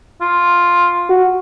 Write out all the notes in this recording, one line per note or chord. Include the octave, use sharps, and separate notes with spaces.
F4
F#4